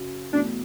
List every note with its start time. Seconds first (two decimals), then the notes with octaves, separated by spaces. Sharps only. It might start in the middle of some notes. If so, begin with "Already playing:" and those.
Already playing: F#2 C#3 F#3
0.32 E2 B2 A3 D4